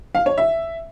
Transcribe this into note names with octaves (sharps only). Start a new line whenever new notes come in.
F5
C#5
E5